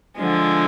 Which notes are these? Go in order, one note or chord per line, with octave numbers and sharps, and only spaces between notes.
D3 F3 G#3